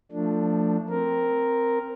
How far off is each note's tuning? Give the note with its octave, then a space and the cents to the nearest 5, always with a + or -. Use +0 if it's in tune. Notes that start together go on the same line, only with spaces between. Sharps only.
F3 +0 A3 +25 D4 +0
C4 +0 A#4 +0